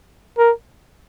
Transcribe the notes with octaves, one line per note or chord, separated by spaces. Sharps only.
A#4